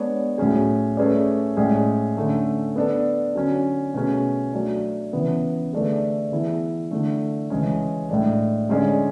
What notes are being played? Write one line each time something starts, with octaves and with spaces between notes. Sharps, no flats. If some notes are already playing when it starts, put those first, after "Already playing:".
Already playing: G#3 B3 D4 G#4 C#5
A2 F#3 C#4 G#4
A3 C#4 G#4 B4 D5
A2 G#3 C#4 G#4 D5
D3 A3 C#4
B3 D4 A4
D3 F#3 C#4
B2 A3 C#4 G#4
F#3 A3 D4
C#3 E3 B3
D3 A3 D4 G#4 B4
E3 B3 E4 G#4
D3 A3 D4
C#3 E3 G#3 C#4
A2 G#3 D4
D3 G#3 C#4 G#4 D5